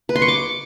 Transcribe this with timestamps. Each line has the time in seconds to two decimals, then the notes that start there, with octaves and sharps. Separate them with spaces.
0.09 B4
0.16 C6
0.22 C#6
0.28 D6